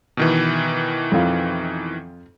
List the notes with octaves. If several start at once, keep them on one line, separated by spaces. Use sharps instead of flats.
B2 D#3 E3
F2 F4